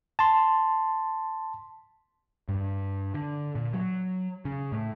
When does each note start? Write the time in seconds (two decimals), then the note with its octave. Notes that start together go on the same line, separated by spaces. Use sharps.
0.19 A5 C6
2.49 G2
3.14 D3
3.55 A#2
3.73 F#3
4.45 C#3
4.72 A2